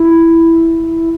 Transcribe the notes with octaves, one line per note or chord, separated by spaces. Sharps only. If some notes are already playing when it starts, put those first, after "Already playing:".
Already playing: E4